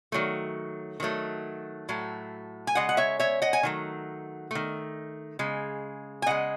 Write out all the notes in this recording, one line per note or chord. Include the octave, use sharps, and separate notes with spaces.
D#3 F#3 A3
D#3 F#3 A3
A2 F#3 A3
G#5
C#3 G#3 D#5 F#5
F#5
C#5 E5
C#5 E5
D#5 F#5
G#5
D#3 F#3 A3
D#3 A3
C#3 G#3
G#5
C#3 G#3 D#5 F#5